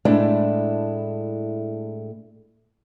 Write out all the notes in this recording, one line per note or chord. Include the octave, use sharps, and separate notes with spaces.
A2 G#3 A3 D4 E4